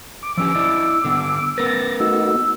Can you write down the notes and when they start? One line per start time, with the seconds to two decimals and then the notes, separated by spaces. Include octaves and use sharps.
0.23 D6
0.37 F3 C#4 G4 E6
0.55 E4 D5 D#5
1.05 D3 B3
1.58 B3 A#4 B4 A6 A#6
2.00 A3 D#4 F#4 E6